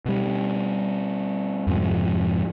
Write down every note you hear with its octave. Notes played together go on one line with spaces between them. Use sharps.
B2 G3
F2 G#2 C3 F3